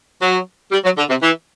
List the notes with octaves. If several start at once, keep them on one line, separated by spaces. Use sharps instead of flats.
F#3
G3
F#3
D3
C3
E3